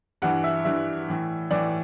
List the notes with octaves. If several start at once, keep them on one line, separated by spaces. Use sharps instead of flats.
G2 E3 F#5
E5
G2 E3 E5
A2 E3
A2 E3 D5